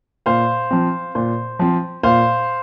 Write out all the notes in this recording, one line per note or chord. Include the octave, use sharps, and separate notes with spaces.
A#2 C5 F5
F3 C4
A#2 C5
F3 C4
A#2 C5 F5